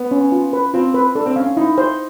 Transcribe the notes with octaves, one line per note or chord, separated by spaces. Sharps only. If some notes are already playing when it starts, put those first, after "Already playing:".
Already playing: B3
C#4
F4
B4
C4 F4
B4
D4 A4
C4
C#4 F5
C#4
D#4 E4
C5